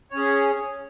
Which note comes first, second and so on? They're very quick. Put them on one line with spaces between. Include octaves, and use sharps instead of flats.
C#5 C#4 G#4